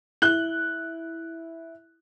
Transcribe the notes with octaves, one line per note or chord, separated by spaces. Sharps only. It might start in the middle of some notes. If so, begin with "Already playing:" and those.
E4 F#6 G7